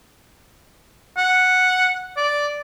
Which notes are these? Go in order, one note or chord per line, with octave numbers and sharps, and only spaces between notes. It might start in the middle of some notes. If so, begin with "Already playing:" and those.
F#5
D5